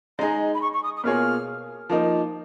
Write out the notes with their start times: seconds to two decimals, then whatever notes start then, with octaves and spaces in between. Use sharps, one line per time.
0.19 G#3 D#4 G#4 A#5
0.54 B5
0.61 C#6
0.73 C#6
0.83 D#6
0.97 D#6
1.04 B2 A#3 F4 G#4 C#5 F6
1.90 F3 A#3 D#4